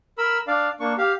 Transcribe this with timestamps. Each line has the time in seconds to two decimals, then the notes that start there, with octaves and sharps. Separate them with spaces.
0.18 A#4 B5 E6
0.47 D4 D5 F5
0.80 A#3 D4 C#6
0.98 G4 F5